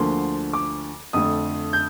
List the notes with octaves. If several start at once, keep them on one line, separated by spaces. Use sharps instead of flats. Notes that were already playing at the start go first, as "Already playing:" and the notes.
Already playing: D2 D3 F3 A#3 C6
D6
F2 D3 A3 D#6
G6